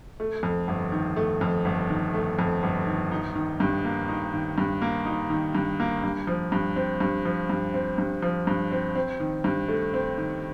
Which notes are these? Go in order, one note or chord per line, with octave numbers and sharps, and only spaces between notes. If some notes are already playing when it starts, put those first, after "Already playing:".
A3
F2
G1
D#3
A3
F2
G1
D#3
A3
F2
G1
D#3
D#4
D#3
G2
A#3
D#4
D#3
G2
A#3
D#4
D#3
G2
A#3
G2
F3
G2
C4
G2
F3
G2
C4
G2
F3
G2
C4
C4
D#3
G2
A3
C4
D#3